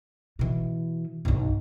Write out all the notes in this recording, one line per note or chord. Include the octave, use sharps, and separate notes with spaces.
B2 E3
B1 G2